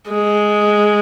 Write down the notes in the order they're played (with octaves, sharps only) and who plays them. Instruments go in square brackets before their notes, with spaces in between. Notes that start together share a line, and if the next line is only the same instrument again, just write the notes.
[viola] G#3